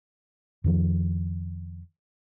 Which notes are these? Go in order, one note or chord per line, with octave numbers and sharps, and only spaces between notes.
F2 D#3 F3